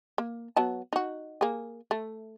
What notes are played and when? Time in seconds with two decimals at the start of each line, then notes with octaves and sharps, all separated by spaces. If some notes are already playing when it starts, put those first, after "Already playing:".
0.18 A#3
0.56 F#3 B3 A5
0.93 D#4 F#4
1.41 A#3 G#4
1.91 A3